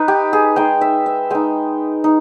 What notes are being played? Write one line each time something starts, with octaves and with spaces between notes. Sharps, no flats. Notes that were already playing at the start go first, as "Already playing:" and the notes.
Already playing: D#4 B4
G4
G#4
G#3 D#4 G5
E5
E5
G#3 D#4 G5
D#4